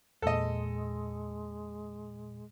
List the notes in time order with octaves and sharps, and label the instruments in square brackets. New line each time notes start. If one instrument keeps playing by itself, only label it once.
[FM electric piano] E2 A#2 [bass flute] G#3 [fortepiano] A4 D#5